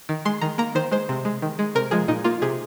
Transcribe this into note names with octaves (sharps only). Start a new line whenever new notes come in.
D#3
G#3 C6
D#3 A#5
A#3 A#5
D#3 C5
G#3 C5
C3
G#3
D#3
G#3
C3 A#4
F3 G#3 G#4
A#2 D#4
A#3 F4
C3 G#4